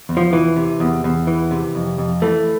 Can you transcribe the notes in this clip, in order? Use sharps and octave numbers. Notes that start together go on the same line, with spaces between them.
E2
F3
E3
C3
E2
E2
E3
C3
F2
F2
E3 A3